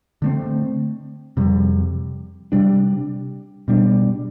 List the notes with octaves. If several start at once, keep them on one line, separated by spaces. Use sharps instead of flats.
D3 A3 C4
F2 C3 G3
C3 G3 D4
B2 G3 D4